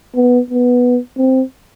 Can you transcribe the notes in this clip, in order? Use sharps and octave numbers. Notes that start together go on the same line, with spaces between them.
B3
B3
C4